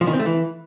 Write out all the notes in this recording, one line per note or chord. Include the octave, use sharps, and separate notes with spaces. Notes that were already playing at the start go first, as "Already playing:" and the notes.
F3
D#3
C4
A3
E3